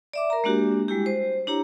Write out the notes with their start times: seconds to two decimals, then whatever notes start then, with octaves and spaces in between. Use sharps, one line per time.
0.13 D5 E5 D6
0.30 A#4 A#5
0.44 G#3 A#3 D4 F#4 G4
0.88 G3 G#3 E4 G4
1.06 C5
1.47 D4 E4 G4 C#5 A#5